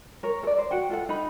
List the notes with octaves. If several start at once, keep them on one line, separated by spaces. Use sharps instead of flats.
A#4 C#5
A4 D5
C5
F#4 F#5 G5
F4 A4 F#5
D#4 B5